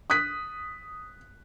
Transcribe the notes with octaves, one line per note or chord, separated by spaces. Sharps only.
D#6 F#6 B6